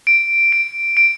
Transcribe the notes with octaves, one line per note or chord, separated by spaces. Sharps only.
D7
D7
D7